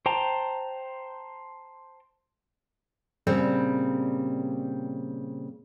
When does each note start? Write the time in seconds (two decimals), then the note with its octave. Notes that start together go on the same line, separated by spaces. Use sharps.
0.06 C5 G5 A5 A#5
3.27 A#2 C#3 G3 C4